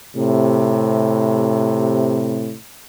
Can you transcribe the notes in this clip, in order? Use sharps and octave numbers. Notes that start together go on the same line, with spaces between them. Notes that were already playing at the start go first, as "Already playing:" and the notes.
A2 C3